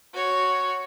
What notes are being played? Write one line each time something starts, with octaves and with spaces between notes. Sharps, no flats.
F#4 C#5